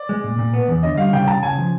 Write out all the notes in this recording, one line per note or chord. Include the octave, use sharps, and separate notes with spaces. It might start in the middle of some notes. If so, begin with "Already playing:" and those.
Already playing: D5
G#3
A#2
A#2
B3
E2
D3 D#5
G3 F5
C#3 G5
C#3 A5
C#3 G#5
F3